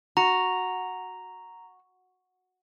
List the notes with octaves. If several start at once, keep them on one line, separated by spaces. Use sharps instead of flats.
F#4 A#5